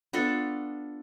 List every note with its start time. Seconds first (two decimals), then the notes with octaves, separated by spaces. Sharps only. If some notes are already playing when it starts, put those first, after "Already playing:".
0.13 B3 D4 F4 A4